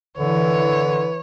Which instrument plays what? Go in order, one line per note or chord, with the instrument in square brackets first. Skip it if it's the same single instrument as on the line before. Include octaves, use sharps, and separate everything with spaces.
[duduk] D3 [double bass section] E3 [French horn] B4 [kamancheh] C#5